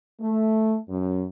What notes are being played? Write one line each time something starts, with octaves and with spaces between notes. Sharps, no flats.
A3
F#2